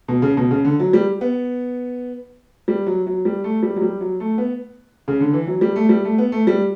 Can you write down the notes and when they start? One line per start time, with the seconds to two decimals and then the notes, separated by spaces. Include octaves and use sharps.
0.08 B2
0.22 C#3
0.37 B2
0.51 C#3
0.65 D3
0.80 F#3
0.93 G3
1.21 B3
2.68 G3
2.87 F#3
3.06 F#3
3.25 G3
3.44 A3
3.63 G3
3.76 F#3
3.82 G3
4.01 F#3
4.20 A3
4.38 B3
5.08 C#3
5.20 D3
5.33 E3
5.47 F#3
5.61 G3
5.76 A3
5.89 G3
6.05 A3
6.18 B3
6.32 A3
6.47 G3